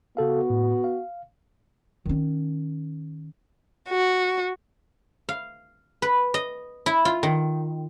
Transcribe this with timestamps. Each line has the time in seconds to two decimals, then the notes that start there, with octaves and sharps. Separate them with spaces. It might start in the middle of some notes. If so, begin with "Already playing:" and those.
0.17 C#3 B3 F#4 A4 F5
0.50 A2
0.84 F5
2.06 D#3 C#4
3.89 F#4
5.29 F5
6.02 B4
6.34 D#5
6.86 E4
7.05 F4
7.23 D#3